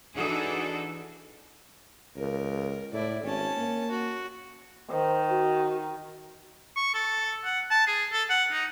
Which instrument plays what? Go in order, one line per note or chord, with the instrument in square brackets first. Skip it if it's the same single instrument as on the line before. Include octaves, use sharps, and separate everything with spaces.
[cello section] E3 D4 D#4 F#4 G#4 A4
[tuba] C#2 [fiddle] A#4
[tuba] A2 [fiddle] E4 D5
[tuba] G#1 [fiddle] C#4 A5
[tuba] A#3
[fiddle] F#4
[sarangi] D#3 [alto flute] C5
[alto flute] F#4
[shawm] C#6
A4
F#5
A5
G#4
A4
F#5
D#4